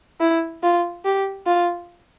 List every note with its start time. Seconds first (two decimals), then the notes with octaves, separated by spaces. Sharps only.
0.20 E4
0.63 F4
1.05 G4
1.46 F4